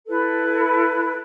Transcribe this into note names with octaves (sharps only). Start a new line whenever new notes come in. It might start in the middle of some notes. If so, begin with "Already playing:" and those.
E4 A4 B4